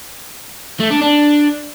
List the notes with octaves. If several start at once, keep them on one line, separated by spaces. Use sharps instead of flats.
A3
D4
D4